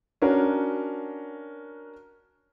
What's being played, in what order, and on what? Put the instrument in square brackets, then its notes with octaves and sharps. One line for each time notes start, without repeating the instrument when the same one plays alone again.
[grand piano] C#4 D4 F#4 A#4